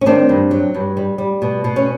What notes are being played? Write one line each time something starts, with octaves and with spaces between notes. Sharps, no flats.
C#4
D#3 C4 D4
G2
F#3
G2
G3
G3
B2
B2
C#4